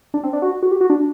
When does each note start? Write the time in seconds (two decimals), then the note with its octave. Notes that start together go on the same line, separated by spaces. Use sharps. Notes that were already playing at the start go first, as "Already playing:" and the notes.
0.14 D4
0.23 C4
0.33 D4
0.42 F#4
0.63 F#4
0.71 G4
0.81 F#4
0.90 D4